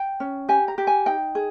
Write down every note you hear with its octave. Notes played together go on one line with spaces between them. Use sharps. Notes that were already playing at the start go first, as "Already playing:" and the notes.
Already playing: G5
C#4
G4 G#5
A#5
G4
G#5
D#4 G5
G#4